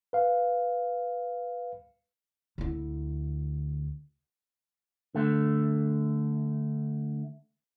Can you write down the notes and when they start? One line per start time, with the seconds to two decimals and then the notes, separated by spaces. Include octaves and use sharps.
0.13 B4 F5
2.58 D2 E4
5.15 D3 A3